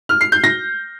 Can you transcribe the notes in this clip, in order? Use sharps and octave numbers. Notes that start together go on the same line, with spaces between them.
F6
C7
G6
A#6